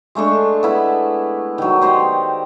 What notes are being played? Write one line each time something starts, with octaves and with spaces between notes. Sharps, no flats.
G#3 A3 D4 C#6
B3 E4 B5
D#3 F#3
G4 C5 C#5 D#5